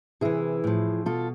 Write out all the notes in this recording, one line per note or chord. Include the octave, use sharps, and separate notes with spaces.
C3 E3 E4 G#4
A2 F3
B2 F4 A4